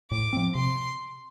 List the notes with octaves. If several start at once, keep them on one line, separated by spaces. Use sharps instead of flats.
A2 D6
F3 C4
C3 C6